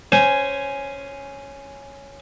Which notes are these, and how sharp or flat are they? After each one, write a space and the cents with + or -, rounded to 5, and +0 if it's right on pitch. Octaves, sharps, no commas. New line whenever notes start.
C#4 +0 C5 -15 G#5 +0